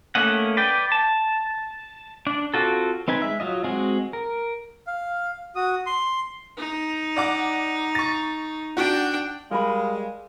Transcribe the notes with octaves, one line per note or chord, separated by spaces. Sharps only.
A3 A#3 C#4 D#5 F#5
B4 D5 G5
A5
D4
C4 F4 F#4 A4
C4 D#4 B4 G#5
G#3 E5
F#3 F4 D#5
G#3 C4 F#4 G#4
A#4
F5
F#4 D#6
C6
D#4
D5 F#5 D6
C#6 A6
D4 F#4 G5
G3 G#3 A#4 F5 B5